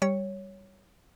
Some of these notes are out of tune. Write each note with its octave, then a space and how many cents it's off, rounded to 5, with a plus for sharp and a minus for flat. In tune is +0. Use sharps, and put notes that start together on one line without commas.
G3 +0 C#5 +0